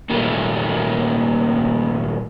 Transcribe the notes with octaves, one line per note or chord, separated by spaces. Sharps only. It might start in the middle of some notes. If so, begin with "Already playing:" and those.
A#2 D#3 G3 A3 A#3